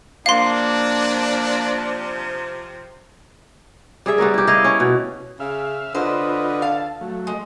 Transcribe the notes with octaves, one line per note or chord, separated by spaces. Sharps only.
C3 F3 A#3 D4 F5 C6
G3 G#4 E5
G3 B3 C#4 A#4
E4 G4
E4 D#5 F5
C#4
B2
C#3 E5 F5
D3 F4 B4 C5 D#5
F5 A5
F#3 A3
G#3